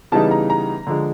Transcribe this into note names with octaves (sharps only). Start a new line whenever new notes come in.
C#3 E3 G3 B3 D#4 A5
A#5
A#5
D3 F3 G#3